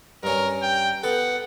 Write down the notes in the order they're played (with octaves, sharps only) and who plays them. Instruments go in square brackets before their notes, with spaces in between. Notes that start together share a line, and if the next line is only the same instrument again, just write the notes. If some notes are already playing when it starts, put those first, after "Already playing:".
[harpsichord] G2 C#4 [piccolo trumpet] A#4
[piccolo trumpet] G5
[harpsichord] B3 A4 [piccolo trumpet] F#5